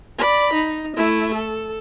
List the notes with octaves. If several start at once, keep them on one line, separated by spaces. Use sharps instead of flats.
D5 B5
D#4
A3 E4
A4